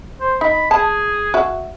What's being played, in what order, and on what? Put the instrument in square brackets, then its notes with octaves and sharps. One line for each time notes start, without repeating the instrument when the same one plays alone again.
[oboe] C5
[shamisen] D#4 [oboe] B5
[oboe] G#4 [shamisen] A5
[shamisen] F#4 E5